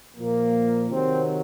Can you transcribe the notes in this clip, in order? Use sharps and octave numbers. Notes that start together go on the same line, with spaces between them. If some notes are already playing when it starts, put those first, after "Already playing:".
A#2 F3 A#3
C3 D#3 F#3 C4